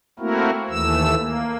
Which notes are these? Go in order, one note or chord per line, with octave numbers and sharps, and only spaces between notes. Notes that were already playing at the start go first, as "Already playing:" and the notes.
A3 A#3 C4 E4 F#4 A#4
D#2 E3 A3 E6
A#3